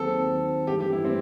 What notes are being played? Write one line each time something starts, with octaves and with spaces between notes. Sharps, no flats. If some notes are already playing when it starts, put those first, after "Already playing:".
Already playing: D#2 D#3 F#3 C4 A4
A1 G2 E3 G4
G4
E4
C4